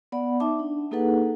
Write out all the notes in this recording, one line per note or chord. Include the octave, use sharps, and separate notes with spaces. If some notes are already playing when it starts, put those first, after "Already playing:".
B3 D5 F#5 B5
D#4 E5 A5 D6
D4
A#3 D#4 G#4 A4 B4 F#5